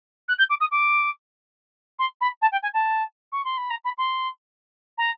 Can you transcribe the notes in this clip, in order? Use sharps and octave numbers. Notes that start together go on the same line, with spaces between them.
F#6
G6
D6
D#6
D6
C6
B5
A5
G5
G#5
A5
C#6
C6
B5
A#5
B5
C6
A#5